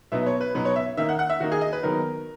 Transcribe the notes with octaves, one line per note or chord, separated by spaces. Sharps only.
B2 F#3 B3 D#4 E5
C#5
B4
B2 F#3 B3 D#4 B4
C#5
E5
D#3 A#3 D#4 E5
F#5
F#5
E5
D#3 A#3 D#4 F#4
G#4
D#5
B4
D#3 F#3 B3 D#4 A#4